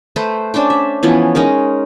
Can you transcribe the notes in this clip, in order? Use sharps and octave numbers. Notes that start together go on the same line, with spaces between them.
A3 B4 C5
C#4 D4 C5 G5
E5
E3 F3 B3 C#4
G#3 C#4 D#4 A#4